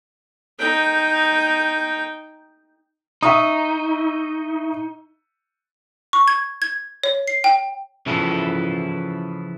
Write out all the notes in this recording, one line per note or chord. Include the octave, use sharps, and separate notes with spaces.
D#4 G5
D#4 E5 C#6 D#6
C#6
G#6
G#6
C#5
C7
G5
C#3 E3 F3 E4 A4